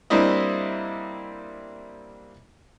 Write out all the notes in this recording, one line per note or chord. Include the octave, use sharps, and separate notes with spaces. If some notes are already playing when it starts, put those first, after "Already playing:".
G3 A#3 C4 D4 E4 D#5